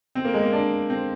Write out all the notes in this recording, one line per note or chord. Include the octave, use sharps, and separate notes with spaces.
C4
A#3
G#3
A#3
D4
C4